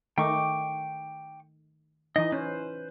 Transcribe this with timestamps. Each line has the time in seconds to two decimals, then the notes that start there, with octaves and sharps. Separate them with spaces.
0.18 D#3 A3 D#4 G5 C#6 D6
2.16 E3 D#4 D#5
2.32 C#4 B4 C5